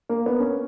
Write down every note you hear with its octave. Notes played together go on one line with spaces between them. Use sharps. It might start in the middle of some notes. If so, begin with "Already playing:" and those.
A#3
B3
C#4